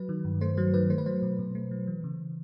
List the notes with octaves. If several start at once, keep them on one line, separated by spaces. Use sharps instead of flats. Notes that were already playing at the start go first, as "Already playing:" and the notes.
Already playing: F#3 B4
D#3
G2
A3 C5
F#3 C5
D#3 B4
A3 C5
B4
F#3 C5
B2
B2
A3
F#3
E3
C#3